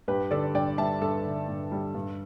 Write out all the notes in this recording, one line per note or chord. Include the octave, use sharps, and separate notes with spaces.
G2 G4 B4
D3 A4 D5
G2 D5 G5
G3 E5 A5
G2 A4
D3
G2
G3
G2